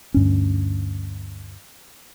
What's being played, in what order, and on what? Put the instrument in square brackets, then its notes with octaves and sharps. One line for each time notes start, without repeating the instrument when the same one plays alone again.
[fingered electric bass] D2 G2 C#4